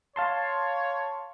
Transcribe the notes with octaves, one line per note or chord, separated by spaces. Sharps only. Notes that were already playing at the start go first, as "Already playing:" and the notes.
C#5 F5 A5 C6